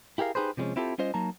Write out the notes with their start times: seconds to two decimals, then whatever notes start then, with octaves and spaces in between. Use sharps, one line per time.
0.18 E4 G4 G#4 A#4 F5
0.35 D#4 G4 G#4 B4 C5
0.57 C3 F3 G3 G#3 C#4
0.76 C4 E4 F4 G4 A4
0.98 G3 C#4 F4 C5 D#5
1.14 F#3 A#3 D#4 A5 A#5